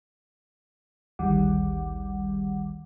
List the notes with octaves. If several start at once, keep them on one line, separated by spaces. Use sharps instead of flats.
G#1 D2 D#3 G3 F#5 D6